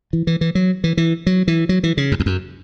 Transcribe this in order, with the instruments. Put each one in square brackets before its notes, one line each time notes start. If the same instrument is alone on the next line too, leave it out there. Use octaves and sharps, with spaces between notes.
[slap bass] E3
E3
E3
F#3
E3
E3
F#3
E3
F#3
E3
C#3
F#2
E2
F#2